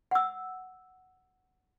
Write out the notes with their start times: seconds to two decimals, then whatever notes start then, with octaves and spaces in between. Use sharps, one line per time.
0.11 F#5 E6